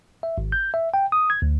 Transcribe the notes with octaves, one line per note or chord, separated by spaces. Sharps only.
E5
G#1
G6
E5
G5
D#6
G#6
D2